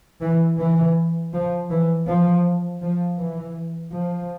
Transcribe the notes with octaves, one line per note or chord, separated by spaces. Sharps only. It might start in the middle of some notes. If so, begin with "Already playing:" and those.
E3
E3
F3
E3
F3
F3
E3
F3